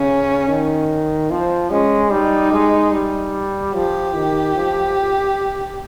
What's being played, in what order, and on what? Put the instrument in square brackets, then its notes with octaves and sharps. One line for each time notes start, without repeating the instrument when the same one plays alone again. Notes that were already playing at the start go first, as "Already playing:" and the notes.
Already playing: [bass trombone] C#3 [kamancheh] C#4
[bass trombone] D#3
[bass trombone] F3 [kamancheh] C4
[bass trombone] G#3 [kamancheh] C#4
[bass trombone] G3 [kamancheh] D#4
[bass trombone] G#3
G3
[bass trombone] F3 [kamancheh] G4
[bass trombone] D#3
F3